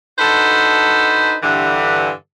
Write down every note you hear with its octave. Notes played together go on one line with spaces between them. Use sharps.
D4 D#4 F#4 A4 B4 C5
G2 D3 E3